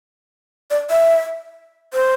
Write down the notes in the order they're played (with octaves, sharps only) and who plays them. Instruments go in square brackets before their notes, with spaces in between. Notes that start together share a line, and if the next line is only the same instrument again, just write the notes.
[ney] D5
E5
C5